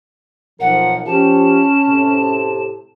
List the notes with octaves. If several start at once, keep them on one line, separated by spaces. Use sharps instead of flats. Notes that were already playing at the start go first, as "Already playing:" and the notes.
B1 F3 A#4 F#5
F3 C#4 G4 A5
A2 C3